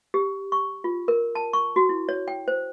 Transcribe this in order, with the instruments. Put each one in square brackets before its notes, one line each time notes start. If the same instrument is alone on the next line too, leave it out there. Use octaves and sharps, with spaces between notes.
[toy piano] G4
C#6
F4
A#4
A5
C#6
F#4
E4
C#5
G5
C5